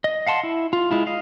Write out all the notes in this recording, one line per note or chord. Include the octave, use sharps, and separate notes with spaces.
D#5
F5 F#5 A5 C6
E4
F4
G#3 E4 F4
D#5 F5